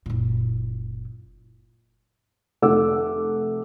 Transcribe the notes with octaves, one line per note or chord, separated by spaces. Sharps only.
F#1 A#2
F1 A3 F#5 D6 E6